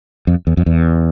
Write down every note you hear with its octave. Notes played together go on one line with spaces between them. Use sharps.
F2
E2
F2
E2